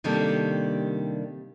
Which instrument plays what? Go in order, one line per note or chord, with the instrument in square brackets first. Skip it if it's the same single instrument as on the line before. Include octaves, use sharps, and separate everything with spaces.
[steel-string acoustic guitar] C3 D#3 G3 A#3 D4 A4